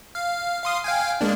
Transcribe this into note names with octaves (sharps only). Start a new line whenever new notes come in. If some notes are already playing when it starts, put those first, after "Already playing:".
F5
F5 C6 D#6
F5 G5 G#5
G#3 A#3 D4